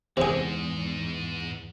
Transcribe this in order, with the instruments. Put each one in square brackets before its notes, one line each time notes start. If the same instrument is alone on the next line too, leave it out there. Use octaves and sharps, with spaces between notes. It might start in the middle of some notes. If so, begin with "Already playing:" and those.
[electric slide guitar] E2 [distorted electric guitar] G#2 G#3 [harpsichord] C3 G#4